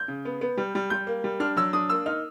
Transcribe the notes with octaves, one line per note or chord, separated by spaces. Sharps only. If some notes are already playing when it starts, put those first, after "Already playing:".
Already playing: G6
C#3
B3
B3
G3
G3
G3 G6
A#3
G3
D4 F6
F#3 E6
D4 D#6
A#3 E6
D#4 F6